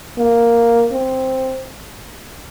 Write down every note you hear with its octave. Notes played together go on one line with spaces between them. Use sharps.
A#3
C4